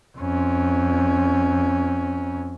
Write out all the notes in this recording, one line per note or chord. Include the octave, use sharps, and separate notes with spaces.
F2 C#4